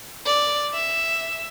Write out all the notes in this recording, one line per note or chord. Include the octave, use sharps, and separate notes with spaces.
D5
E5